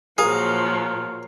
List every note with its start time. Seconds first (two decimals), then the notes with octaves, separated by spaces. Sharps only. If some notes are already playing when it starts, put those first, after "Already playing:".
0.18 A#2 F3 F#3 G#4 A#4 F5